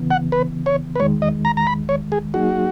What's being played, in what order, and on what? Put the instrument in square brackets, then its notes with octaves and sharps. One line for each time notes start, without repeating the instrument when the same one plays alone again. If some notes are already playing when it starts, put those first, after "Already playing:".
Already playing: [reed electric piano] C#3 E3 B3
[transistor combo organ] F#5
B4
C#5
B4
[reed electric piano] E2 D#3 G#3 [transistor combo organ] C#5
[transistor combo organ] D#5
A#5
A#5
B5
C#5
G#4
[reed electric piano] F#3 A#3 D#4 G#4 [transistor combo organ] F#4